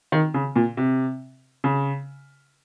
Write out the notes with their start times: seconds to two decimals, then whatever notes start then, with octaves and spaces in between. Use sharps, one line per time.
0.12 D#3
0.34 C#3
0.56 A#2
0.77 C3
1.64 C#3